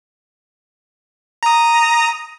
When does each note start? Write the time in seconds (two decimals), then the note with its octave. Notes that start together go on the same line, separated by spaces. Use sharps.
1.43 A#5 D#6